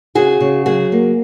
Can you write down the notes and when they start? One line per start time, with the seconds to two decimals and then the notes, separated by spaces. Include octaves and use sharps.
0.15 C#3 F#4 G#4
0.40 C#3
0.66 F#3 F#4 G#4
0.92 A#3